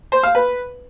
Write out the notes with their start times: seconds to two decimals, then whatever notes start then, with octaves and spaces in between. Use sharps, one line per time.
0.12 C5
0.23 F5
0.35 B4